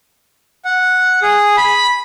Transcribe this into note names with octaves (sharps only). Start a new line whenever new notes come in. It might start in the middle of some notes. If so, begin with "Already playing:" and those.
F#5
G#4
B5